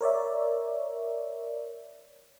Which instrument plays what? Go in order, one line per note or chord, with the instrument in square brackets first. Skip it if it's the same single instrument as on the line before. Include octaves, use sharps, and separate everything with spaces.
[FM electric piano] A#4 C#5 D5 E5